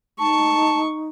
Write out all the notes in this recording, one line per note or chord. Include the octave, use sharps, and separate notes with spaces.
D#4 A5 C#6